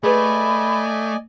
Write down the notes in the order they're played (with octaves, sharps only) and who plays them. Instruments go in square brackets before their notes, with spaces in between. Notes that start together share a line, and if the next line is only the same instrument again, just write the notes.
[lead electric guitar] A3 [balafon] G#4 B4 [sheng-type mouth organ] D5 D#5 G#5 [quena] B5